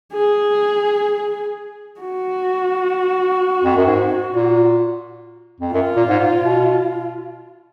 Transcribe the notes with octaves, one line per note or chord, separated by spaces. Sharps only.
G#4
F#4
F2
F#2
G#2
A#2
F2
F#2 F4
A#2
G#2
A#2
B2